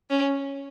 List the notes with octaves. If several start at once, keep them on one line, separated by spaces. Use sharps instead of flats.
C#4